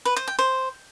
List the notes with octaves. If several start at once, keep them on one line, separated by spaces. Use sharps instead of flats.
B4
C5
G5
C5